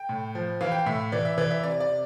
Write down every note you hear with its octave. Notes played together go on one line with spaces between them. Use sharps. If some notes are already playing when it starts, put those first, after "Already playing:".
Already playing: G5
A2
F3
E3 F5
G5
F5
A2 E5
E3 D5
E5
E3 D5
E5
C3 D5
D5
C3